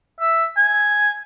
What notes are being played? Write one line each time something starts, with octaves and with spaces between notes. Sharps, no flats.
E5
G#5